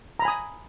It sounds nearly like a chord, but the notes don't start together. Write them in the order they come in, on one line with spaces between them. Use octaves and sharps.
A#5 B5 G#5 D#6